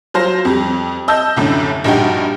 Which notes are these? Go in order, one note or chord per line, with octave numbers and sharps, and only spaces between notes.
F#3 F4 C5 A#6
F2 G3
D#5 A5 E6 G6
C2 F#2 A2 D3
A#1 G2 D#4 F#4 G5